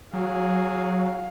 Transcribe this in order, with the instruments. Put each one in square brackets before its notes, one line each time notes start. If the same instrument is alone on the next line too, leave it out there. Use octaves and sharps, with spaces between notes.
[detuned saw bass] F#3 [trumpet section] F#4 G#4 [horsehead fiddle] F5